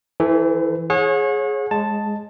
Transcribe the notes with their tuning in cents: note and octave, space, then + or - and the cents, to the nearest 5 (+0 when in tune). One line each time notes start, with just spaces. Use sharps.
E3 -10 A4 +0 C5 -45
G#4 +15 C#5 -30 F#5 -35
G#3 +0 A5 +0